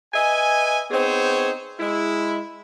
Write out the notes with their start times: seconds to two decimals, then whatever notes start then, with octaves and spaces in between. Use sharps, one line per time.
0.13 B4 D#5 E5 G#5
0.91 B3 C4 D#4 G#4 C5 C#5
1.79 G#3 E4